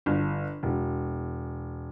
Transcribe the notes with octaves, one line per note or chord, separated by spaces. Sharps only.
G1
E1